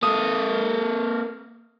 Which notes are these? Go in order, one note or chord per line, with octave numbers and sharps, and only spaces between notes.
A#3 A4 D#6